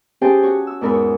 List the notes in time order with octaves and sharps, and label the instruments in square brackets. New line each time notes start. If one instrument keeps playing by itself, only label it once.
[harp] C#4 G4 G#4 C5 G5 A5
F#4 C#5
E6
E2 G#2 A#4 B5 E6
C#5